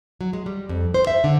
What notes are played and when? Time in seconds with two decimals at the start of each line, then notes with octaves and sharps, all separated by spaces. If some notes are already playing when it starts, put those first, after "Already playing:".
0.21 F#3
0.33 G#3
0.46 G3
0.69 F2
0.94 C5
1.07 E5
1.24 D3